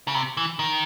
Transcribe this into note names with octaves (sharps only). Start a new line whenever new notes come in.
C#3
C3
E3
D#3